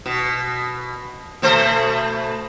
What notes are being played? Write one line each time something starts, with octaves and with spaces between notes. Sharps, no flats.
B2
B2 A3 C5